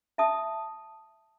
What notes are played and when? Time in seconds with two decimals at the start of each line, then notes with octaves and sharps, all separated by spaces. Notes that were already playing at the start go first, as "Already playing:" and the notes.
0.18 E5 A5 D#6